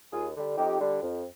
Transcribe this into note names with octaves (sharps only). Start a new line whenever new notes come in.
D#2 F4 G#4
D3 G3
F2 D#4 G4
D3 G3
F2